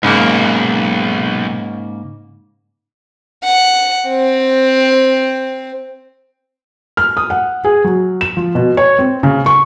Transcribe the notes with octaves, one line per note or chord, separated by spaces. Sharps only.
B1 G#2 C#3 A#3
F#5
C4
F6
D#6
F#5
G#4
F#3
E7
F3
B2
C#5
C4
C#3
C#6